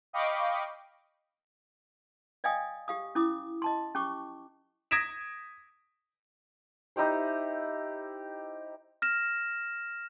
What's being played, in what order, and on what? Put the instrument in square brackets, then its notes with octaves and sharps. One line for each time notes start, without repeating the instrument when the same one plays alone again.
[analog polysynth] D#5 F5 G5 B5 C#6 D6
[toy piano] D5 D#5 F5 G5 G#5 D#6
G4 F5 D#6
C#4 E4 D6 D#6
D#5 A5 C6
C#4 G4 C#6 D6
[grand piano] D#6 G#6 A#6 B6 D7 E7
[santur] D#4 E4 G4 C5
[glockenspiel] F6 A#6 E7